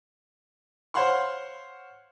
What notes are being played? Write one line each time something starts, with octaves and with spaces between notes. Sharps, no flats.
C5 C#5 F5 F#5 C6 C#6